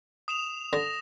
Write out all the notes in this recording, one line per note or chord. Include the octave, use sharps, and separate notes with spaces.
D#6 E7 F7
D3 A#6